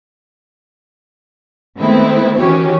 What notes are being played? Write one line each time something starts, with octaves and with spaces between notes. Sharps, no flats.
D#3 G#3 A3 B3 C4 E4
D#3 E3 C#4 F#4 G4 C#5